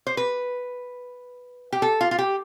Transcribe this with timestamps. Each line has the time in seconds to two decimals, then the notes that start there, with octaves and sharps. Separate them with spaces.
0.07 C5
0.17 B4
1.72 G4
1.82 A4
2.01 F4
2.11 F4
2.18 G4